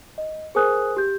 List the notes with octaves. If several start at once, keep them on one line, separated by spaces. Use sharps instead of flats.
D#5
G#4 A#4 C5 G#5 D#6 F#6
G4 G6